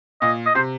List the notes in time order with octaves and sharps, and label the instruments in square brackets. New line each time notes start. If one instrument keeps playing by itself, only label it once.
[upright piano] A#2 [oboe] D#5
[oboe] D#5
[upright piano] C3 [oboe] C5